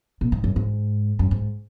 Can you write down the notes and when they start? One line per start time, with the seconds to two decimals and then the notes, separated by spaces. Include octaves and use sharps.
0.21 A#2
0.32 G#2
0.44 F#2
0.56 G#2
1.19 F#2
1.31 G#2